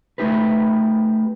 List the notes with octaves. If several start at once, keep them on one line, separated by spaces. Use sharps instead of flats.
A3 B3 D#4 G4 B4